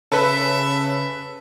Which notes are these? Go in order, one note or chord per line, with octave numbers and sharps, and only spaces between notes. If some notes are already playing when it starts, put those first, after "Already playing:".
C#3 A4 B4 E5